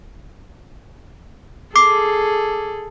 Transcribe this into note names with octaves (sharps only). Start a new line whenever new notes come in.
G#4 A4 D6 C7